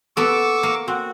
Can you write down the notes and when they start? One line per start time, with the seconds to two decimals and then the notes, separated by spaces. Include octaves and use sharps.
0.17 B3 A4 C#6 D6 E6
0.63 A#3
0.88 C4 F#4